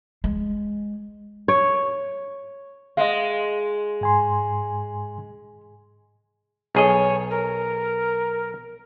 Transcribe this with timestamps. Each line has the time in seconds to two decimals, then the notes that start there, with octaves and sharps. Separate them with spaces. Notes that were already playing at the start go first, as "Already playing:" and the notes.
0.24 G#3
1.48 C#5
2.97 G#3 D#5 F5
4.01 G#2 G#5 C6
6.75 B1 G#4 C#5 D#5
7.31 A#4